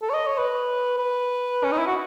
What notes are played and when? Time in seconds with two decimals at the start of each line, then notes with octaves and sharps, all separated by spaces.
0.02 A4
0.10 C#5
0.14 D#5
0.26 C#5
0.38 B4
0.98 B4
1.64 C#4
1.72 D#4
1.79 E4
1.87 F#4